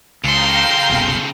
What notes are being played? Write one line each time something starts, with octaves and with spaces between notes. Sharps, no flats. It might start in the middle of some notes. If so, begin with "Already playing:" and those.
C#2 C#3 A4 F5 G5 A#5 C6
F#1 C2 B2